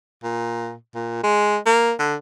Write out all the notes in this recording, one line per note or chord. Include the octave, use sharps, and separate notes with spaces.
A#2
A#2
G#3
A#3
D3